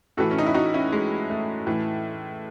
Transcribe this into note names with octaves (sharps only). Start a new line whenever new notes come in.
A2 E3 F#4 A4
C#4
D#4
E4
D#4 F#4
C#4 E4
G#3
A3
A2 E3